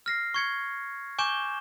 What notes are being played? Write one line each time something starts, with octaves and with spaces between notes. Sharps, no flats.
F6 A#6 C7
C#6 G#6 C#7
G#5 C#6 D6 G6 E7 G7